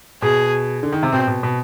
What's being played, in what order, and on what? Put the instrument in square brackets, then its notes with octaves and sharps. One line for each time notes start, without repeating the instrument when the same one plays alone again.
[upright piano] B2 [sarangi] G#4
[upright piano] D3
D#3
C3
[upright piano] B2 [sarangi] C4
[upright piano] B2
B2